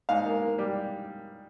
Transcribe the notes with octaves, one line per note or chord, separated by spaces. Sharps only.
G#2 F5
A#3
A#3
G3